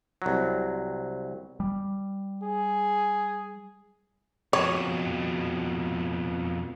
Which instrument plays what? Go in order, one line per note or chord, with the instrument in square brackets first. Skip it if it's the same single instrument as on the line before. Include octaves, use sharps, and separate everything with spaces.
[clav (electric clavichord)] C2 F#3
[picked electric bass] G3
[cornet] G#4
[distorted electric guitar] F2 B2 [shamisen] C#5